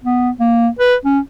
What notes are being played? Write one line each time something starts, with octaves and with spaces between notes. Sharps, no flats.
B3
A#3
B4
C#4